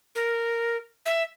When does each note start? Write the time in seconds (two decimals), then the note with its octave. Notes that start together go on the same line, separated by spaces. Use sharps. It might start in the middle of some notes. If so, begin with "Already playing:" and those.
0.15 A#4
1.06 E5